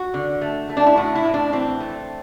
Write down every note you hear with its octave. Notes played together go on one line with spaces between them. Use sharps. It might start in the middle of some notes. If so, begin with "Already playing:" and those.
Already playing: F#4
D3
A3
A3
D4
E4
A2 F#4
E4
A2
D4
E3 C4
A3